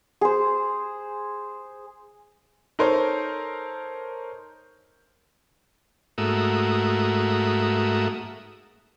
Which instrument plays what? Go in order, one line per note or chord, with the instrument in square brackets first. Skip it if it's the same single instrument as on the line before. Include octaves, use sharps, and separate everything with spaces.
[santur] G#4 C5
[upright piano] D#4 A4 A#4 C5 C#5
[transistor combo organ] G#2 A3 A#3 F#4 E5 D#6